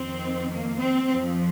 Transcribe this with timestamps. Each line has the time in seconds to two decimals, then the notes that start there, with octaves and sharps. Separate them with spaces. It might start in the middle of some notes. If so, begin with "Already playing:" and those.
Already playing: F2 D#3 C4
0.50 A#3
0.79 C4
1.10 F2 F3